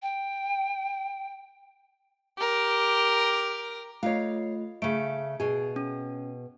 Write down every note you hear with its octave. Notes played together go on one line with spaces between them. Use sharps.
G5
G4 A#4
A3 F4 C#5 D#5 F5
C#3 A3 D7
B2 G#4
C#4